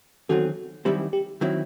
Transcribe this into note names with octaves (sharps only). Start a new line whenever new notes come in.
E2 D#3 F#3 C4 F#4 A4
F#2 D#3 G3 C4 E4 G4
G4
D#3 F#3 C4 E4 F#4